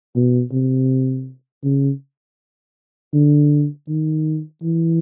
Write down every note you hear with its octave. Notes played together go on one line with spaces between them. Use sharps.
B2
C3
C#3
D3
D#3
E3